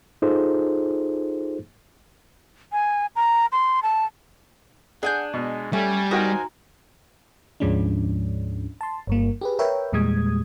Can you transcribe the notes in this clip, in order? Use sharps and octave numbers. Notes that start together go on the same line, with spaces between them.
D#4 F4 G#4 A4 C5
G#5
A#5
C6
A5
D4 G#4 F#5 G#5 G6
B2 G#3
G3 A3 C#4 G#5
D#4 F#4 A#4 C5 G5 G#5 A#5
D2 G#2 F3 G#3 C#4 D4
A5 C6
G1 G2 A#3
G4 G#4 B4
A#4 B4 C#5 E5 G5
E2 A#2 G3 G#3 D#6 G#6